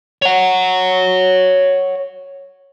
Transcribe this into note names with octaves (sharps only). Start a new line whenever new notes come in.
C#5 F#5